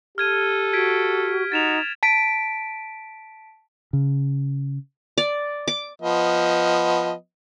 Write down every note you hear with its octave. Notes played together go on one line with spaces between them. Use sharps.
G4 A4 F6 G#6 D#7
F#4 G#6 B6 D7
D#4 F#4 A6 E7 F7
A5 B6 D7
C#3
D5
D6
F3 B3 D#5